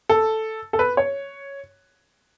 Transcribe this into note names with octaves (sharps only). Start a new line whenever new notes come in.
A4
A4
B4
C#5